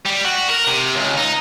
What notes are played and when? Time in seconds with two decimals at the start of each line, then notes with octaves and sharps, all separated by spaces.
0.06 G3
0.24 F#4
0.49 A#4
0.67 C3
0.94 C#2
1.17 D#4